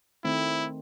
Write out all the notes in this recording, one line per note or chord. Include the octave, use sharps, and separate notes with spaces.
D#3 A3 C4 E4